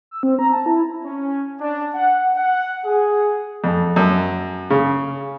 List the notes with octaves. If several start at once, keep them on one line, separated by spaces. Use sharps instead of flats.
E6
C4
A#5
A5
E4
C#4
D4
F#5
F#5
G#4
F2
F#2
C#3